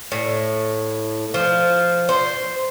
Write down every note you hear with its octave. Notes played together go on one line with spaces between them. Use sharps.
A2
F3
C5